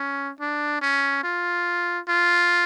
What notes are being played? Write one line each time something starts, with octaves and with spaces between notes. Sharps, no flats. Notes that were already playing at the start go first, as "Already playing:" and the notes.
Already playing: C#4
D4
C#4
F4
F4